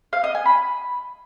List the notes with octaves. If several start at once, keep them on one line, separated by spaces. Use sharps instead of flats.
F5
D#5
G#5
B5